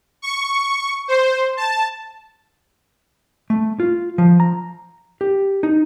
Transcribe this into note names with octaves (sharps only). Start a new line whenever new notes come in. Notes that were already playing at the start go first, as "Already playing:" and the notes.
C#6
C5
A5
A3
F4
F3
A#5
G4
D#4